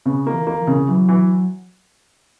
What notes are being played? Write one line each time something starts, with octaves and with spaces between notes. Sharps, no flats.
C#3 B3
A#3
E3
A#3
E3
C#3
E3 F#3
E3